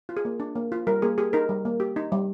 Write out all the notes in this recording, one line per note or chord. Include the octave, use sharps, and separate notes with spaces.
F4
G#4
A#3
D4
A#3
F4
G3 A#4
A#3 G#4
G4 G#4
D#4 A#4
G3
A#3
G4
D#4
G3